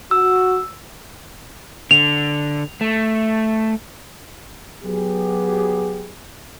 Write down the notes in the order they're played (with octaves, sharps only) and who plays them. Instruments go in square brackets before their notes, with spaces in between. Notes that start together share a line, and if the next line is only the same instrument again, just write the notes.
[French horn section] F#4 [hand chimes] E6
[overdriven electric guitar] D3 [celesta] F7
[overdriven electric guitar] A3
[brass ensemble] F#3 B3 G4 G#4